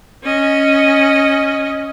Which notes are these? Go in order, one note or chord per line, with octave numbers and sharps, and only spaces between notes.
C#4 D#5